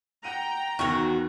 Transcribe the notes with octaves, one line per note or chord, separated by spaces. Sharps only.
F#5 G5 A#5 D#7
E2 D#3 F#3 F#4